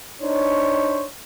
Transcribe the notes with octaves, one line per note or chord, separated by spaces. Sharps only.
D4 D#4 C5 C#5